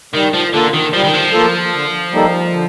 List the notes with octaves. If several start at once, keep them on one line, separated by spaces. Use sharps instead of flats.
D#3 G3
F3
D3 A#3 F4 A4
D#3
F3 G3
D#3
F3
A#3 F4 A4
D3
G3 A#3 D#4 A4
D3